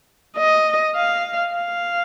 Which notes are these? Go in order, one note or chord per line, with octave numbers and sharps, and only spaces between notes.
D#5
F5
F5